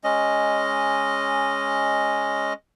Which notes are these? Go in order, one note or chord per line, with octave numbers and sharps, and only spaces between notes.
G#3 C#4 D#5